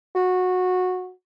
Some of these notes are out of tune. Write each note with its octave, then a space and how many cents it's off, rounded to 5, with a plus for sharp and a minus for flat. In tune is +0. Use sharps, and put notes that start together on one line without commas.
F#4 -15